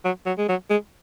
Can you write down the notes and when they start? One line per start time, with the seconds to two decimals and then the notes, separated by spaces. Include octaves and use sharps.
0.04 F#3
0.26 F#3
0.38 G#3
0.49 F#3
0.70 G#3